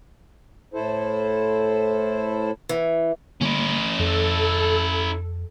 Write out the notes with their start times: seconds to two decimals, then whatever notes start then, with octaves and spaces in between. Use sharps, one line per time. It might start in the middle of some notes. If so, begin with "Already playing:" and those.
0.74 A2 E4 A4 C5
2.69 E3
3.41 D3 G3 A#3 C#4 E4
3.99 F2 A4